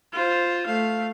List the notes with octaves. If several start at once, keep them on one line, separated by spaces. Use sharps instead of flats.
F4 C5
A3 F5